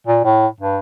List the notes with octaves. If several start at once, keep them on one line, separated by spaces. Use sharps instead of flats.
A#2
A2
G2